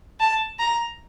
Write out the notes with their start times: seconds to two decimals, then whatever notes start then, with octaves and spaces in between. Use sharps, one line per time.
0.20 A5
0.59 A#5